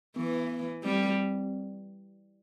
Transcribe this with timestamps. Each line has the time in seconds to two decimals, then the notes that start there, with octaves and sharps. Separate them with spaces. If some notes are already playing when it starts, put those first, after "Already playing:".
0.16 E3 B3
0.84 G3 C4